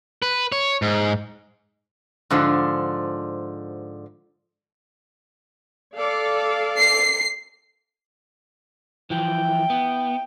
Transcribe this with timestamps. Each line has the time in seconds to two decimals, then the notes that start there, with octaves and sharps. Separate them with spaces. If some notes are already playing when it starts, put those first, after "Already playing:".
0.22 B4
0.52 C#5
0.82 G#2
2.31 G#2 D3 F3 D4
5.95 A4 D5 F5
6.76 C7
9.10 E3 F3 E4 G5
9.70 B3